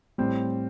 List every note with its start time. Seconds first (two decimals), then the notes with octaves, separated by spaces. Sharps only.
0.18 A2 G3 C4